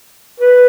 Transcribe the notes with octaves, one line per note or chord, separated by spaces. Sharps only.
B4